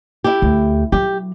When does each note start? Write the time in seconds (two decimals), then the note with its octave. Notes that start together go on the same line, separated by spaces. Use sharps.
0.24 E4 G4
0.42 D2
0.92 F#3 G4